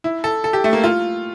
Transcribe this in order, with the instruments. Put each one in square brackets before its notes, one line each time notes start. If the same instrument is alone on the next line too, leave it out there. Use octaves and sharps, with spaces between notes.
[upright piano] E4
A4
A4
G4
A3
A#3
F4